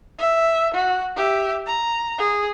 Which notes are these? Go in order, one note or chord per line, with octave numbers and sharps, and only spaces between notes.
E5
F#4
G4 E5
A#5
G#4